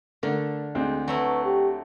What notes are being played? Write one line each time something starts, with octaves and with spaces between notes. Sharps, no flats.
D3 A3 D4 A#4
D2 G#3 C4
F#3 A3 E4 B4
G4